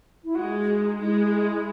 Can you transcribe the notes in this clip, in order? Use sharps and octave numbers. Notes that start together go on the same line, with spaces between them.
E4
G#3 F#4
D#4
G#3 E4